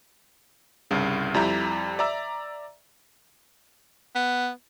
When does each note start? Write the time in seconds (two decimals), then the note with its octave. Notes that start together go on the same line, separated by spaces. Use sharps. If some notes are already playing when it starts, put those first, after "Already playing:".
0.91 C2 G2 C#3
1.34 F2 G3 E4 E5 A#5 G6
1.99 D5 E5 A#5 E6
4.15 B3